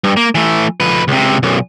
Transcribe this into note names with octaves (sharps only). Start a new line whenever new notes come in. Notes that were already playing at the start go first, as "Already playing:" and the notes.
G2
A#3
E3 A3
F2 B4
C#2 C3
B1 F#2